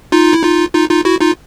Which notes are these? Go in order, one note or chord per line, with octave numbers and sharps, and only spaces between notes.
D#4 F4
E4
D#4 F4
D#4 F4
D#4 F4
E4 F#4
D#4 F4